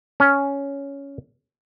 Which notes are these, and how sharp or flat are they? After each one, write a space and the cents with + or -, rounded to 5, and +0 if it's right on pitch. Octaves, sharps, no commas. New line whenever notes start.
C#4 +10